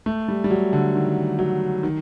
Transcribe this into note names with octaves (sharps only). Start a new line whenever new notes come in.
A3
G3
G3
F#3
D3
D#3
F#3
D#3